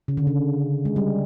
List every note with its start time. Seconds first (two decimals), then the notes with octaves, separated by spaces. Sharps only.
0.08 C#3
0.17 D3
0.27 C#3
0.85 G#3
0.96 G3